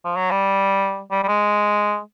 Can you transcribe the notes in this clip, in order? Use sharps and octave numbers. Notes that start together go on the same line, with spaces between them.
F3
F#3
G3
G3
G3
G#3